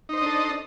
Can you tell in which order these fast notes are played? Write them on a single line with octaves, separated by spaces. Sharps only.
D#4 C5 D#5 D4 A4